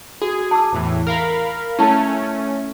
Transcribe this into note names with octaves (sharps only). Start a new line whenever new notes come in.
F#4 G#4
A5 D6 E6
E2 A2 E3
A#4 F5 B5
A3 C#4 E4 A5